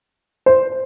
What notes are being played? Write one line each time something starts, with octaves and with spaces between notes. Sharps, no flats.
C5